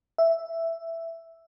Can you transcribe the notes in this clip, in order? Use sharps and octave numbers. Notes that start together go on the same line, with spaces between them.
E5